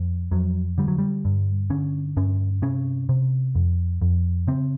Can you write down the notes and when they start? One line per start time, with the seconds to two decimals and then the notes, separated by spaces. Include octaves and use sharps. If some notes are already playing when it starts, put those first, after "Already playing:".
Already playing: F2
0.31 F2 F#3
0.78 D3 G3
0.88 F#3
0.98 G3
1.25 G2
1.70 D3 C#4
2.17 G2 C#4
2.62 C3 C#4
3.09 C3
3.55 F2
4.02 F2
4.47 C#3 C4